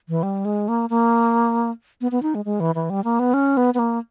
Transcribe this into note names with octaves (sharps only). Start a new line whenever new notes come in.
E3
G3
G#3
A#3
A#3
B3
B3
D#4
G#3
G#3
E3
E3
G3
A#3
B3
C#4
B3
B3
A#3